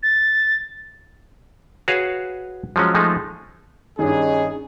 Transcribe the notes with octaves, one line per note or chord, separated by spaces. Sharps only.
A6
F#4 G#4 B4 C#5 F5
F3 F#3 G#3 C#4
F3 G#3 A3 D#4
G2 D#3 C#4 D#4 G#4